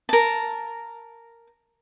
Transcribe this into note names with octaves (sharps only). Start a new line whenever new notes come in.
A#4 A5